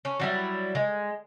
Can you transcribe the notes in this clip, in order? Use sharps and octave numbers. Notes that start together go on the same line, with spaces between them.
C#4
F#3 G3 E4
G#3